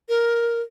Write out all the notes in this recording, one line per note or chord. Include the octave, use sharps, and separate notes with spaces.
A#4